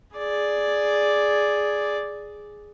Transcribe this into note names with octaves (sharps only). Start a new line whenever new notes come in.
G#4 D5